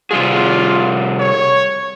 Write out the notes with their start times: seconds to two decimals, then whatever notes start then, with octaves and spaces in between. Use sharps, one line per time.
0.11 C3 G3 F4 G#4
1.20 C#5